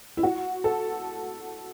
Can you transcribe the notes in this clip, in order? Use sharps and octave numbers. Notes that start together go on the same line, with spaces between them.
E4
F#4
A4